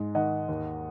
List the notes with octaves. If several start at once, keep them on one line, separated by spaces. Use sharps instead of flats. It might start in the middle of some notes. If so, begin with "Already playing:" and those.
Already playing: G#2 G#3
D#3 D#5 F#5
D#2